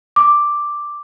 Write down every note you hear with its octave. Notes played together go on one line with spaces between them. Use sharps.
D6